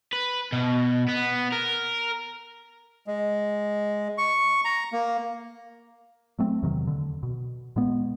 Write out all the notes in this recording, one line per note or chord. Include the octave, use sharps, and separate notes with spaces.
B4
B2
B3
A#4
G#3
C#6
A#5
A#3
F#3 A3 C4
E2 C3 D#3 F#3
D3
B2
A#2 G#3 B3